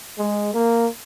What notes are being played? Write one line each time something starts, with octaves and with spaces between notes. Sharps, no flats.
G#3
A#3